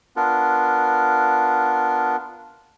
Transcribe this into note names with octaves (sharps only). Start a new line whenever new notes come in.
B3 D4 F4 A#4